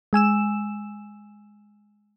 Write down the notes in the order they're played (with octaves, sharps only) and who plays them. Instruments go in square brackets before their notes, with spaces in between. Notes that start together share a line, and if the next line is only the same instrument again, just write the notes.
[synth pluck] G#3 G#5 E6 E7